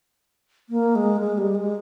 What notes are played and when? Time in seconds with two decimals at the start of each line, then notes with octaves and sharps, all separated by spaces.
0.69 A#3
0.95 G#3
1.21 G#3
1.38 G3
1.55 G#3